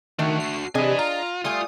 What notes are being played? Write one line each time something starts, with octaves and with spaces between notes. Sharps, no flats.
D#3 A3 D4 F#4
C7
C3 D4 G#4 B4 D#5 G#5
F4 A#5
G3 A3 F4 G#5 D#6